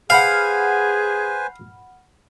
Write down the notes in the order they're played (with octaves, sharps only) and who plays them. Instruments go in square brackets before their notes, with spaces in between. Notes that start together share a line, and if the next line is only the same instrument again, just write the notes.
[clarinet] G#4 [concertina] B4 C5 G#5 [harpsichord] F5 [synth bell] F#5 B5 F6